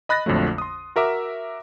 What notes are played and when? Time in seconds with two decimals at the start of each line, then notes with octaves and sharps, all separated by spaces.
0.09 D#5 B5 F#6 A6 A#6
0.26 A#1 F2 D3 F#3 A3
0.58 C6 D#6
0.96 F#4 A#4 E5 D6